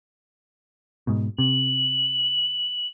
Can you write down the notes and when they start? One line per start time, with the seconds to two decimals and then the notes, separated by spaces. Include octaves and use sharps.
1.07 G#2 B2
1.39 C3 F#7